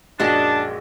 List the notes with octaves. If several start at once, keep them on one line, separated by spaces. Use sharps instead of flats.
A#1 F#2 G#3 D4 F#4 D#5 A5 E7